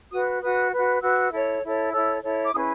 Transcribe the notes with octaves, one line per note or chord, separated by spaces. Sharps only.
F#4 B4 D#6
F#4 B4 D#6
B4
F#4
F#4 B4 E6
E4 A4 C#5
E4 A4 C#5
E4 A4 C#5 E6
E4 A4 C#5
D6
C#4 E4 G#4 B4 D#6